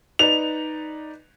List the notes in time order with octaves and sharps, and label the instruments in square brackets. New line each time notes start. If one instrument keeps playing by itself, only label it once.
[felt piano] D#4 B4 D5 [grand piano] F7